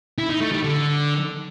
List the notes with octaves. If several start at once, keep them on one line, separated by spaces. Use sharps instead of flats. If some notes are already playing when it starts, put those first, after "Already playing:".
E4
D#4
A3
G3
D3